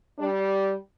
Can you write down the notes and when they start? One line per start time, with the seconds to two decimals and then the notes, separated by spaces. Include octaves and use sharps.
0.18 G3 D4